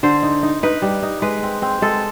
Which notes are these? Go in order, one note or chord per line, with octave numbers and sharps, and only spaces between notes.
D3 C5
D#4
D#4
D#4 B4
G3
D#4
G#3 B4
C4
C4
G#3 A4